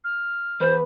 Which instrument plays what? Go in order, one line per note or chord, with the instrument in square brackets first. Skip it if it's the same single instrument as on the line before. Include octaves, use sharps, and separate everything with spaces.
[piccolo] F6
[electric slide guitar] E2 B4 [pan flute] C5